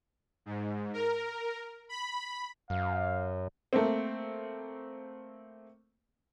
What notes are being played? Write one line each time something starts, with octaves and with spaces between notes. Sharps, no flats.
G#2
A#4
B5
F#2 F5
A3 A#3 C4